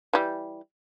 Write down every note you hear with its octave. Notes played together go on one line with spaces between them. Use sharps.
E3 G3